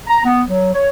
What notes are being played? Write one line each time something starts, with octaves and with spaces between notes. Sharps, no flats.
A#5
B3
F#3
C#5